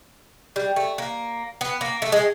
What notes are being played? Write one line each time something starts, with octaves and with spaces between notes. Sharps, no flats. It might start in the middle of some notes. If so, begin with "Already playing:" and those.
G3
A3
A#3
B3
A#3
A3
G#3